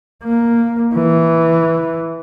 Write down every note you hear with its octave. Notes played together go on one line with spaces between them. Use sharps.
A#3
E3